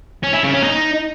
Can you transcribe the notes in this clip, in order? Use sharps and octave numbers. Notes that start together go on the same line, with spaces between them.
C#4
E4
C#3
C#4
D#4